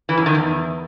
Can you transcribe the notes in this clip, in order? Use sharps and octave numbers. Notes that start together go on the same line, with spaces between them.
E3
F#2
D#3
E2